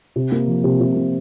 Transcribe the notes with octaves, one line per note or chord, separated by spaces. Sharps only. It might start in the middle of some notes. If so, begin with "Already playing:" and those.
C3
A#3
F3
C3
C3
A#3